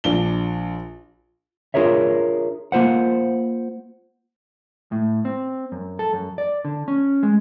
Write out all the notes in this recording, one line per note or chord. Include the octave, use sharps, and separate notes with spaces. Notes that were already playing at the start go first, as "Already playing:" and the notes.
A#1 D4 G7
D4 F4 G#4 A#4 C#5 E5
A#3 F4 C5 F#5
A2
C4
F#2
A4
F#2
D5
D3
C#4
G#3